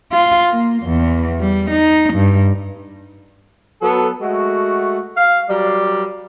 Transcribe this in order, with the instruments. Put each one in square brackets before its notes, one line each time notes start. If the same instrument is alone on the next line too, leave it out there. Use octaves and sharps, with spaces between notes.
[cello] F4
A#3
E2
G3
D#4
G2
[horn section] F#3 B3 A4
G#3 A3 F#4
F5
F#3 G3 A#4 D5